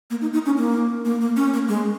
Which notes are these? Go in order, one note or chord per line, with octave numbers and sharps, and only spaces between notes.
A#3
D#4
D#4
C#4
A#3
A#3
A#3
C#4
A#3
G#3